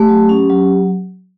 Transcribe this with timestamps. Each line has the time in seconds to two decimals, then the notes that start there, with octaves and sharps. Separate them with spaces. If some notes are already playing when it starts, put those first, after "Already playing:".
Already playing: A3 G4
0.09 F#3
0.29 C#4
0.50 F#3